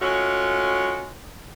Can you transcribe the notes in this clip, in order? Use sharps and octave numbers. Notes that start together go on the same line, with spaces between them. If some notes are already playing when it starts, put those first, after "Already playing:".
G#3 A3 C#4 F4 F#4